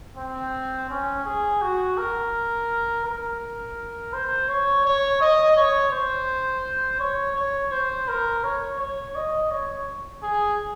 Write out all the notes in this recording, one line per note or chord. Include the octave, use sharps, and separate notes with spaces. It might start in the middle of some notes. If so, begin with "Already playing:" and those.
C4
C#4
G#4
F#4
A#4
A#4
C5
C#5
C#5
D#5
C#5
C5
C#5
C#5
C5
A#4
C#5
C#5
D#5
C#5
G#4